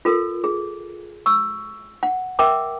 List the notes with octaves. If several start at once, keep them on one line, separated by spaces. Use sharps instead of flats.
F4 A4 A#4
G#4
C#6 E6
F#5
A#4 E5 G5 D6